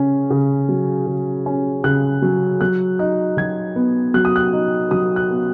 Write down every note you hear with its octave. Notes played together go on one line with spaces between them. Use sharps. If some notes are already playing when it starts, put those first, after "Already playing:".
Already playing: C#3 C#4
C#3
F#3
C#3
C#4
C#3 F#6
F#3
F#3 F#6
D#4 F#6
F#3 G#6
B3
F#3 F#6
D#6
F#6
D#4
F#3 D#6
F#6
B3